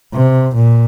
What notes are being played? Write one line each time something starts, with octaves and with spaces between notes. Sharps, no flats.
C3
A#2